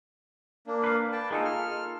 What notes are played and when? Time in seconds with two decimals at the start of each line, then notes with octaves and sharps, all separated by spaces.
0.67 A#3 D4
0.84 B4 F5
1.12 G5 A5
1.31 A#3 D#4 F4 G#4 A4
1.45 F6